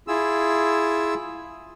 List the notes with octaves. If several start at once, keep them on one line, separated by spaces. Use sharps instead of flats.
E4 F4 G#4 E6